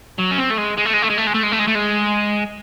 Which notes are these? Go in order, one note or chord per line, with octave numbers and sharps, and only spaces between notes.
F#3
C#4
C4
A3
G#3
G#3
A3
G#3
A3
G#3
A3
G#3
A3
G#3
A3
G#3
A3
G#3